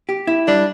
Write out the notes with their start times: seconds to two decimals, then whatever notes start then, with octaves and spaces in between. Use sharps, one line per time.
0.09 G4
0.27 E4
0.47 G3 D4